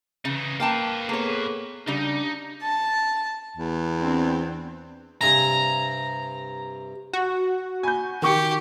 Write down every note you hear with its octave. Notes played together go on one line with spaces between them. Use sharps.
C#3 E3 D#4
A#3 B4 F5 G5 A5
A#3 B3 G#4 A4 C#5
C#3 G3 D4 D#4
A5
E2
C4 D4
G2 C3 G#5 A#5
F#4
G#5 B5 G6
D#3 G4 C#6 C#7